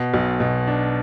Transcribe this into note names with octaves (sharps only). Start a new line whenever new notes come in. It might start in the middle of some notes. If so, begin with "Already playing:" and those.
Already playing: B2
B1
B2
D4